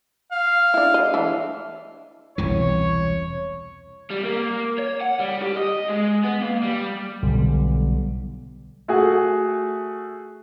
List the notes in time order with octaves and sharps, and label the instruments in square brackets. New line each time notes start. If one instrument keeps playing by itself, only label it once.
[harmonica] F5
[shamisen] D4 E4
D#5
E3 D4
[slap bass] E1 C2 E3 [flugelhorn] C#5
[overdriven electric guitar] G3
A#3
C#5
F#5
G3
G4
D#5
G#3
B3
A#3
G3
[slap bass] B1 D3 G3
[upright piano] A3 F#4 G#4